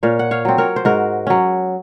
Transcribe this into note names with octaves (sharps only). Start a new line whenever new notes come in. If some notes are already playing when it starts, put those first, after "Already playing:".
A#2 C#5 F5
F#5
C#5 F5
F#3 C4
A#4 C#5
C5
G#2 F#4 A#4
F#3 C#4